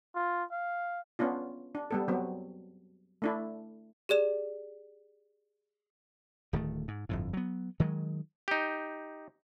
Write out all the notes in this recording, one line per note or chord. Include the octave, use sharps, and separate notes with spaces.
F4
F5
B3 C#4 D4 F4
D4
G3 B3 A4
F#3 B3 C4
A3 D4 E4
G4 G#4 D5 E7
D1 D#3 A3
G#2
G1 F2 A2
F#3 B3
D#3 F#3 G#3
D#4 G4